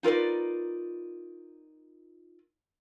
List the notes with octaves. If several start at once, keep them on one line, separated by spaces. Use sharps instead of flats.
D#4 F4 A#4 B4 D5